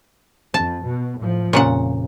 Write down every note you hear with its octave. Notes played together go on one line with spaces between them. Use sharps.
F2 A5
B2
A2 F3
F1 A#2 C#3 F#5